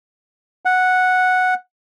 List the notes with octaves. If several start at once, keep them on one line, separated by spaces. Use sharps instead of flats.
F#5